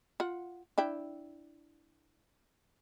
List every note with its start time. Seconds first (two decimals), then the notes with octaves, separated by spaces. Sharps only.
0.20 F4 F#5
0.78 D4 E4 G5